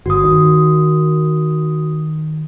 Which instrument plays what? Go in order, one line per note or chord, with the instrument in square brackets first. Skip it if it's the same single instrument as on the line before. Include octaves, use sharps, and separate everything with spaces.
[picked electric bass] G1 [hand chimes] F#4 D#6
[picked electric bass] D#3